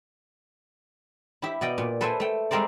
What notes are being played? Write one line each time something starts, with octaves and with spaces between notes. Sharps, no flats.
E4 G4 E5
B2 D5 D#5 G5
A#2
A4 B4 C5 E5 G5 G#5
A3 G5
G3 G#3 C4 A#4 C5 D5